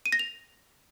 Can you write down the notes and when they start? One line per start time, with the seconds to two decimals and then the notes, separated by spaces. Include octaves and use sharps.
0.06 D#7
0.12 A#6
0.19 F7